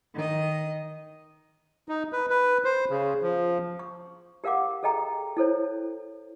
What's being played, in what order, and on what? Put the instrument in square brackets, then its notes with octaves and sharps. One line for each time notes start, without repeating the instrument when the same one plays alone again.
[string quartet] D#3 D#5
[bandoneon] D#4
B4
B4
C5
C#3
F3
[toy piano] C#6
G4 A#4 F5 F#5 D6
G#4 A4 D#5 G5 A#5
E4 A4 C5 C#5